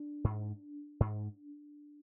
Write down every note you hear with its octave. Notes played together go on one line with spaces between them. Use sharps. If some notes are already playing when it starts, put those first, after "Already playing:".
Already playing: D4
G#2
G#2